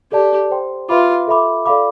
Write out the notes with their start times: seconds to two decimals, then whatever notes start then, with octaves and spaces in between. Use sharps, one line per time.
0.12 G4 A4 D5 A5
0.51 C5 G5 C6
0.89 F4 B4 E5 B5 D6
1.27 A4 E5 B5 D6
1.66 A4 D5 F5 B5 D6